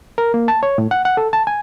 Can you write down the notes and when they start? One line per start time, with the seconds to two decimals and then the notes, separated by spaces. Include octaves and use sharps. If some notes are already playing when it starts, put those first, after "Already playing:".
0.18 A#4
0.34 A#3
0.48 A5
0.63 C#5
0.78 A2
0.91 F#5
1.05 F#5
1.17 A4
1.33 A5
1.47 G#5